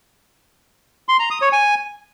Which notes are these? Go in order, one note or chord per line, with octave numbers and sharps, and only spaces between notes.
C6
A#5
D#6
C#5
G#5